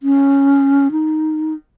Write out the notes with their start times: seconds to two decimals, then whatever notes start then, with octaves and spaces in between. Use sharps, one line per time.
0.03 C#4
0.92 D#4